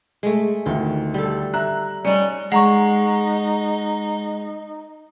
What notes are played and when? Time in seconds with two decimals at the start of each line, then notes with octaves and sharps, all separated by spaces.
0.23 G#3 A3
0.66 D2 D#3 F4
1.14 G3 A4
1.54 E5 A#5 F#6
2.05 G3 C#4 D#4 D#5 C#7
2.52 G#3 D#4 F#5 A#5 C#6